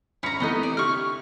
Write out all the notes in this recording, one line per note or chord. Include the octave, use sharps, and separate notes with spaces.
G1 C#4 A#5 B5 C#7
C3 E3 A3 B3 D#4 D#5
D5
D3 E4 G4 C#6 F6